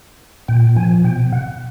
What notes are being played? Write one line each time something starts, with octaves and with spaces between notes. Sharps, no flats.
A#2 G5
F3 G#5
B2 G5
F#5